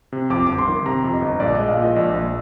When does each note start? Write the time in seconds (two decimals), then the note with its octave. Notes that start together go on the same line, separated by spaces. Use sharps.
0.12 C3
0.30 F2 D6
0.47 G1 D6
0.58 C6
0.67 D#3
0.85 C3 A#5
1.04 F2
1.13 D#5
1.22 G1
1.40 A#1 D5
1.55 G#3 D#5
1.68 F5
1.77 A#2 D#5
1.95 A#1 D5
2.14 A#1